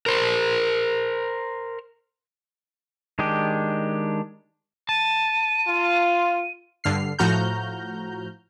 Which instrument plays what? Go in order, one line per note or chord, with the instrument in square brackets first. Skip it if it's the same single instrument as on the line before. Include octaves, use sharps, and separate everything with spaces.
[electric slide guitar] A#4 C5
[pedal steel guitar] D#3 G#3 D4 G4
[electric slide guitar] A5 [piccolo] D#7
[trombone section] F4
[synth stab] G2 D3 F6 C7
A2 F3 F#4 A#5 F6 G6